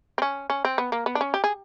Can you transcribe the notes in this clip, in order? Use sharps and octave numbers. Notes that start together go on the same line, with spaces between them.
C4
C#4
C#4
C4
B3
A#3
B3
D4
C#4
G4
G#4